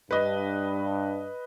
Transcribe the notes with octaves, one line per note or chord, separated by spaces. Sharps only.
G2 D4 B4 D#5